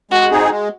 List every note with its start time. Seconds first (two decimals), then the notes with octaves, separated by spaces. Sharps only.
0.11 G#3 F#4
0.31 C4 D#4 G#4
0.50 G#3